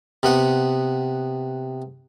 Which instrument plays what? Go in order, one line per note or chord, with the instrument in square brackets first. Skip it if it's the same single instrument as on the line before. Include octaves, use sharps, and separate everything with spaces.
[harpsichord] C3 B3 F#5